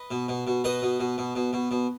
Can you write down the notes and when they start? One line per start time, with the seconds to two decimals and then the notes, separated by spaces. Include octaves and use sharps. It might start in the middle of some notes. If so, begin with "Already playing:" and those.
Already playing: B4 D#5
0.11 B2
0.28 B2
0.47 B2
0.64 B2 B4 D#5
0.82 B2
1.00 B2
1.18 B2
1.35 B2
1.53 B2
1.71 B2